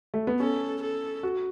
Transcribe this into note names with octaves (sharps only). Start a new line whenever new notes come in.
A3
B3
C#4 A4
A4
F#4